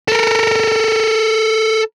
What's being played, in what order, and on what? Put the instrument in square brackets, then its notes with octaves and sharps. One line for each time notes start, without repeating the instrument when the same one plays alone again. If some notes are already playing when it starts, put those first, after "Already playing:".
[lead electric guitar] A4 A#4